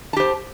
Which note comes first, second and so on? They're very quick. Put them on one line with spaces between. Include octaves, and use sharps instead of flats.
A5 G4 C5